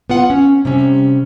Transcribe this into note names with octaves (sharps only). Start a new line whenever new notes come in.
B3 F4 F#5
C#4
C3 G3 C#4